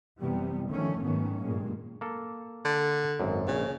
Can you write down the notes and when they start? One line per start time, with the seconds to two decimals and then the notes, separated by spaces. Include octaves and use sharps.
0.21 F#1 F#2 C3 E3 G3 B3
0.69 D3 D#3 F3 A3 C#4
1.02 G#2 D#3 F#3 A3 B3 C#4
1.42 G2 A#2 G#3 A#3
2.01 A#3 A4
2.65 D3
3.20 G#1 F#2
3.48 A#1 C#3